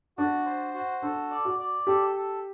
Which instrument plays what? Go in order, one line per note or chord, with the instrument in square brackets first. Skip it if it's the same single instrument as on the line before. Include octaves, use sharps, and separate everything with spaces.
[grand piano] D4 [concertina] F#4
[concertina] C5
F#4
[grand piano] D4 [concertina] A4
[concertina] D5
[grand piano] F#4
[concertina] D5
[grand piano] G4 [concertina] A4
[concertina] A4